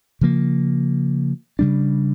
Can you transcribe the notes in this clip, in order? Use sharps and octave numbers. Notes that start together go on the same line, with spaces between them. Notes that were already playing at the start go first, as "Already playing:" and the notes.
C#3 F3 A#3
C#3 G3 D4